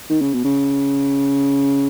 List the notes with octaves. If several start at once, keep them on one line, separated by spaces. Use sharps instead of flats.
D#3
C#3
B2
C#3